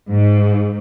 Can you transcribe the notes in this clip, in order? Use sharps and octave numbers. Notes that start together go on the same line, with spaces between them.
G#2